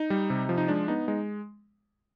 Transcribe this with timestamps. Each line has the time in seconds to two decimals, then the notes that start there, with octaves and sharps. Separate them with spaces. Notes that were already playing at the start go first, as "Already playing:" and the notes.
Already playing: D#4
0.10 G3
0.30 C3
0.49 F3
0.58 D#4
0.68 G#3 D4
0.88 B3 D#4
1.08 G#3 D#4